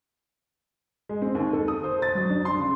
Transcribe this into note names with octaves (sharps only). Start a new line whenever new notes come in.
G#3
C4
D#2
A4
D#6
C5
A6
F#3
D4
C6
C#3